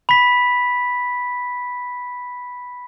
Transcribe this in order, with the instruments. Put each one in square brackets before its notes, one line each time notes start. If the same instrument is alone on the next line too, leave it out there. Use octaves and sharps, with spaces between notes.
[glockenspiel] B5 B6